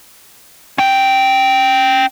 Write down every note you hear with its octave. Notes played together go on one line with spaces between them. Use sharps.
C#4 G5